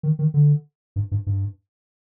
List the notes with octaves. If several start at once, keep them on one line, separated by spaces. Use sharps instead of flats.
D#3
D#3
D3
G2
G2
G2